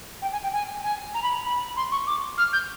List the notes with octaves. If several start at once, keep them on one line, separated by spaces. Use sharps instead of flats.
G5
G#5
G5
G#5
G#5
A#5
B5
A#5
B5
C6
C#6
D6
F6
G6